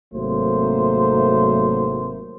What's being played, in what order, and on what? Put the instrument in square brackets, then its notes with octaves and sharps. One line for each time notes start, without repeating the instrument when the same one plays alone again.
[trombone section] G#1 C3 F#3 A3 A#3 C5